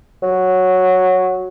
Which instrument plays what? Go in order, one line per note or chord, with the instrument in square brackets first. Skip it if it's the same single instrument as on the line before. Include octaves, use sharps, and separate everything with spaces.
[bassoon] F#3